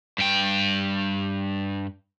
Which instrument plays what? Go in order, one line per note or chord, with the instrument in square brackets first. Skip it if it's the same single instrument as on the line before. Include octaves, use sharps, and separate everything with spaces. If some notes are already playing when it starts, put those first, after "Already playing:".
[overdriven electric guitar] G2 G5